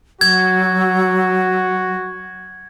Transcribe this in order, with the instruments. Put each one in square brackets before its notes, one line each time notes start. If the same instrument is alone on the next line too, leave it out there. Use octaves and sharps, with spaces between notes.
[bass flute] F#3 [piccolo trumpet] F#4 [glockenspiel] G#6